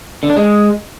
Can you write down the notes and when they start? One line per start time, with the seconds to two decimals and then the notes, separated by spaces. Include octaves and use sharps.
0.23 D3
0.30 D4
0.36 G#3